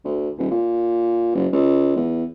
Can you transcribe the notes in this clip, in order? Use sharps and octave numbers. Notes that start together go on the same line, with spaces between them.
D2
D#1
A#2
F#1
C#2
E2